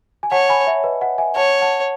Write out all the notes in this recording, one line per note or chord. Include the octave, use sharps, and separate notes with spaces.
G#5
C#5 F#5 A5
G#5 B5
C#5 E5
B4 D#5
D#5 F#5
E5 G#5
C#5 F#5 A5
F#5 A5